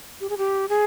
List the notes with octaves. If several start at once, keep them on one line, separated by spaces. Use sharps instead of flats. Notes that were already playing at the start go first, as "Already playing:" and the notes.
G4
G#4
G4
G#4